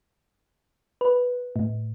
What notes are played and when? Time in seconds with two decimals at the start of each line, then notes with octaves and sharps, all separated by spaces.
1.01 B4
1.56 A2